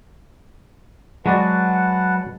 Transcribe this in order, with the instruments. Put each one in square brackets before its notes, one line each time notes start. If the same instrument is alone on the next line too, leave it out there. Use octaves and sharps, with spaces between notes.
[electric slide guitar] F#3 [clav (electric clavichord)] G#3 F#4 D5 [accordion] B4 F#5 A5